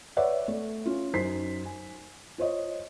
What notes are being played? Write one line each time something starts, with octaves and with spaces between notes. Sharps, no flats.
B4 C#5 D5 E5 F#5
A3
C#4 F4
F#2 D#4 C5 B6 C7
G#5
F4 C5 C#5 D#5